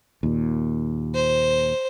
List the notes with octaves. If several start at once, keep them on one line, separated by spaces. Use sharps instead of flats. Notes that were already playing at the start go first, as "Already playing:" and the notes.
D#2 A#2
C5